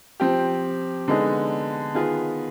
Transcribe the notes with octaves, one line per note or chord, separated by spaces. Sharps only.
F3 C4 G4
D3 G#3 B3 D#4 G#4
D#3 B3 F4 G#4